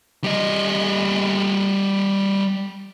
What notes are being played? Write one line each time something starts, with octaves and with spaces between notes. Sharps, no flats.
G3 D#5